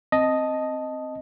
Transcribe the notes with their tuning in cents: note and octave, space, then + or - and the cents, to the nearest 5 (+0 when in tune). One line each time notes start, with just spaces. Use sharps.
C4 +0 D#5 +0 A5 -5